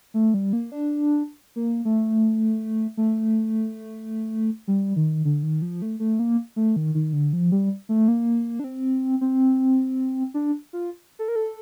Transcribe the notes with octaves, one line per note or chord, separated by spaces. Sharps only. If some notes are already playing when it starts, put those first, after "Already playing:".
A3
G3
A#3
D4
A#3
A3
A3
G3
D#3
D3
D#3
F3
A3
A3
A#3
A3
D#3
D#3
D3
F3
G3
A3
A#3
D4
C4
C4
D4
F4
A4
A#4
A4